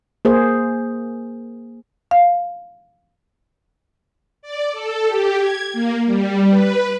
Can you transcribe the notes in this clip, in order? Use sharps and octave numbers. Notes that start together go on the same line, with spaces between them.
A#3 G#4 C5
F5
D5
A4
G4
G#6
A#3
G3
B4